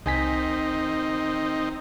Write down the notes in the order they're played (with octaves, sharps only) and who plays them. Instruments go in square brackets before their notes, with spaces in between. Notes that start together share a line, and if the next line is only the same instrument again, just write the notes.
[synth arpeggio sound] C2 G#5 B6 [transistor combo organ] D#3 C4 D#4